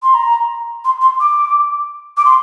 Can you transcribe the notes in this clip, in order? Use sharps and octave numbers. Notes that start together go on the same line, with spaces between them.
C6
A#5
C6
C6
D6
D6
C6